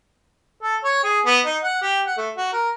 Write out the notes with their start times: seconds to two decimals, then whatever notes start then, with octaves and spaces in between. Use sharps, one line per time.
0.63 A4
0.84 C#5
1.04 G#4
1.26 B3
1.46 D#4
1.63 F#5
1.82 G4
2.06 F#5
2.17 A3
2.37 F#4
2.53 A#4